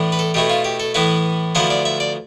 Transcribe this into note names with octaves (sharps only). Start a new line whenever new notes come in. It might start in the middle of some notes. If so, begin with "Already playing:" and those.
Already playing: A2 E3 B3 D4
B4
A4
B2 A3 E4 G4
F4
G4
A4
A2 E3 B3 E4 B4
D2 D3 F3 B3 E4 C5
D5
E5
D5